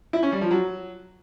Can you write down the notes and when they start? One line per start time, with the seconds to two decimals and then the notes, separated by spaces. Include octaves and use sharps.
0.13 E4
0.23 C#4
0.32 G3
0.41 F3
0.51 F#3